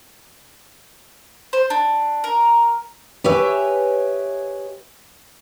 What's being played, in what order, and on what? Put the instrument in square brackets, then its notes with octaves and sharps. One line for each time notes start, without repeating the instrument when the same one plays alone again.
[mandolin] C5
D4
A#4
[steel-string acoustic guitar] G4 B4 C#5 D#5 E5 G#5